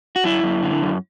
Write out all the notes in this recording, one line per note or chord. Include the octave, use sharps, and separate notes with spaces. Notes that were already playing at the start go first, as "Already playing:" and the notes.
F#4
F#2 E4
F#2
D3
F#2